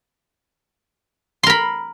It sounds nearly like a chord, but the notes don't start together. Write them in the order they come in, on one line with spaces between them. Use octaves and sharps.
C6 A#4 B5